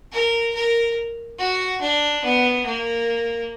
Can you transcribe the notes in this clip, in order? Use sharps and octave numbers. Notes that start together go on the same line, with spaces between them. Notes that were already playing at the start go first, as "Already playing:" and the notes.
A#4
A#4
F#4
D4
B3
A#3